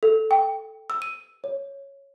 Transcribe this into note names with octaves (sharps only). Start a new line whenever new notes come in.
A4
G5
E6
D#7
C#5